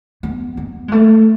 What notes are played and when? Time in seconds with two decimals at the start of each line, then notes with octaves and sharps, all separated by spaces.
0.23 B3
0.57 B3
0.88 G#3
0.92 A3